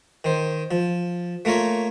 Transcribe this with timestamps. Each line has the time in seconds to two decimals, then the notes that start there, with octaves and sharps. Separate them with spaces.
0.24 D#3 C5
0.71 F3
1.45 A3 A#3 F4 A#4 C#5